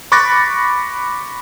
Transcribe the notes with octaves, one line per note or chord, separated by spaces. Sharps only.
B5 C#6 D6 F#6 A6 A#6